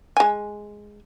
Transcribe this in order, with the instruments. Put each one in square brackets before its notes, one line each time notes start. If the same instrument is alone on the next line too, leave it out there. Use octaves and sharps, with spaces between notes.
[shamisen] G#3 G#5